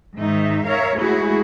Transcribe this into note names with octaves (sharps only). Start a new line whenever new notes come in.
G#2 D#3 D#4 E5
A#4 C#5 E5 F5
G#3 A3 E4 F#4 G#4